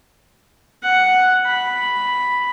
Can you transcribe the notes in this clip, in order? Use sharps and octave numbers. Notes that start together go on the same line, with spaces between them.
F#5
B5